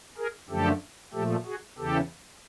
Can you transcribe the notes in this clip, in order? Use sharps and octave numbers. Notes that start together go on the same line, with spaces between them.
G#4 A#4
F#2 D3 F3 A3 G4 A4
A#2 F3 A3 G4 A4
F#4 G#4
E2 C#3 E3 G4 A4